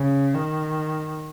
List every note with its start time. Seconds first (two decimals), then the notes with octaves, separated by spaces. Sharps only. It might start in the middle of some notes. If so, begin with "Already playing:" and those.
Already playing: C#3
0.34 D#3